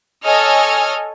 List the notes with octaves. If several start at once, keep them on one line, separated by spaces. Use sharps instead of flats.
A4 C#5 D#5 G#5 F6